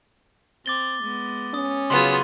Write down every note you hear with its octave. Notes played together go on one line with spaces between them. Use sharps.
C4 D6 A6 G7
G#3 B3
C#4 D#6
C#3 F#3 B3 F4 G#4 C6